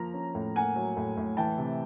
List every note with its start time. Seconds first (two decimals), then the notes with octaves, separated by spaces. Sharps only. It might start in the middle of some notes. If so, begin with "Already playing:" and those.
Already playing: F3 A#3 A#5
0.14 C#4
0.35 A2
0.56 A#3 F#5 G#5
0.76 F#3
0.97 A2
1.17 A2
1.37 E3 G5 A5
1.58 C3